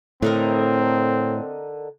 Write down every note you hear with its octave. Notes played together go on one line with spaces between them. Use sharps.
A2 D3 C4 D#4 A#4